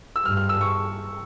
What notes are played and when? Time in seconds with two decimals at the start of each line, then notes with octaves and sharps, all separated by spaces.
0.16 E6
0.25 G2 F6
0.37 F6
0.49 E6
0.61 C#6